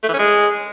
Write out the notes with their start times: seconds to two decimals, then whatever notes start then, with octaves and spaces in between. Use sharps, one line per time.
0.03 A3
0.08 E3
0.14 C#4
0.19 G#3